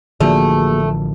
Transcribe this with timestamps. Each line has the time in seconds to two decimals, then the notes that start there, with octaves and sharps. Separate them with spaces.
0.20 A1 D3 F3 A3 A#3 F#4 G#4